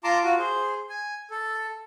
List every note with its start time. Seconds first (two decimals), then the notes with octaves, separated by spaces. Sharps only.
0.04 F4 A5 A#5 C6 D6
0.23 F4 F#4
0.39 G#4 C5
0.89 G#5
1.31 A4